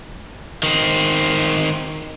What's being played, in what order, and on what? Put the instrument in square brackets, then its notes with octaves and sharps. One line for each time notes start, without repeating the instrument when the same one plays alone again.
[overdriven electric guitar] D#3 C4